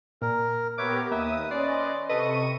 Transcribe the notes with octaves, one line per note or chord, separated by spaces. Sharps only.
A#2 A#4
B3 G4 A#4 B4 C#5 E5 D6
D#2 A#3 B4 E5 D#6
C#4 D5 D#5 C6
C3 A4 B4 D#5 C#6 D#7